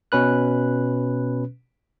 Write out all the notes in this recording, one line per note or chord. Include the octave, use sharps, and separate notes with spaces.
B2 C#4 B4 F#6